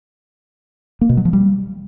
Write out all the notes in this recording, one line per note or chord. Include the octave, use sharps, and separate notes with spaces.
A#3
B2
F#3
F3
G3